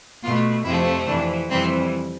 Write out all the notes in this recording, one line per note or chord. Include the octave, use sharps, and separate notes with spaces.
B2 A3 F4
F2 C3 F3 A3 E4
F2 C3 E3 D4
F2 C3 E3 G3 C4